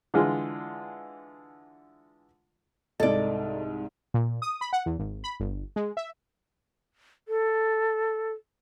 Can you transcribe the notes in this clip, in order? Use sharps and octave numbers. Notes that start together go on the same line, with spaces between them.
D3 E3 G#3 F4
C2 G#2 A4 D5 D#5
A#2
D#6
B5
F#5
E2
G#1
B5
G1
G#3
E5
A4